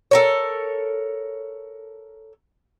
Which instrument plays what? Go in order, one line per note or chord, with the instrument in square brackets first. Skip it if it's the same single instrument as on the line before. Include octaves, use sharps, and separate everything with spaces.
[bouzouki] A4 A#4 C#5